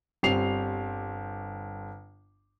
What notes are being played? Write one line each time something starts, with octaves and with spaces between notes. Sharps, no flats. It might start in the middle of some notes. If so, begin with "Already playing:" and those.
G1 G3 C4 C7 F7